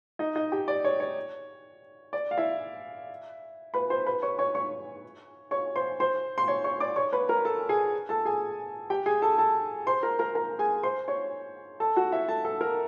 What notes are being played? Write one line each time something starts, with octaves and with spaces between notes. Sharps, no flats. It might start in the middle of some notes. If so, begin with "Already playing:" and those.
D#4 D#5
D#4 D#5
G4 G5
D5
C#5
C#5
D5
F5
E4 E5
B4 B5
C5 C6
B4 B5
C#5 C#6
C#5 C#6
C#5 C#6
C#5 C#6
C5 C6
C5 C6
C6
C#5 C#6
C#5 C#6
D5 D6
C#5 C#6
B4 B5
A#4 A#5
A4 A5
G#4 G#5
A4 A5
G#4 G#5
G4 G5
G#4 G#5
A4 A5
A4 A5
C5 C6
A#4 A#5
A#4 A#5
A#4 A#5
G#4 G#5
C5 C6
C#5 C#6
A4 A5
F#4 F#5
E4 E5
A4 A5
A4 A5
A#4 A#5